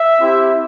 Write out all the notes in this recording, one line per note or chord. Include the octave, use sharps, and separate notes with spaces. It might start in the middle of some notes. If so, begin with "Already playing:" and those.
Already playing: E5
C4 E4 G4